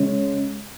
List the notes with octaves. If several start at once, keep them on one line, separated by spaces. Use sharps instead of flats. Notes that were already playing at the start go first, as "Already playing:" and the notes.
Already playing: C#3 G#3 C#4